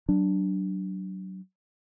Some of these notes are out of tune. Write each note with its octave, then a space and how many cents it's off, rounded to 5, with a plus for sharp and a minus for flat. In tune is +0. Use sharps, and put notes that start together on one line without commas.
F#3 +30 D4 +0